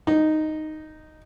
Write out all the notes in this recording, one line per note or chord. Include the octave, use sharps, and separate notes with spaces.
D#4